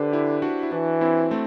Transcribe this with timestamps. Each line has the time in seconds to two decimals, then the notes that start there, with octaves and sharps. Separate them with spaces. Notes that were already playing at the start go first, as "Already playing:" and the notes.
Already playing: D3 G4 B4 C5
0.12 E4 G4
0.42 D4 F#4
0.63 E4
0.72 E3 D4 F#4
1.01 C4 E4
1.31 A3 C4